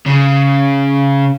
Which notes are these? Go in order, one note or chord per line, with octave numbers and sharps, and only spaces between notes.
C#3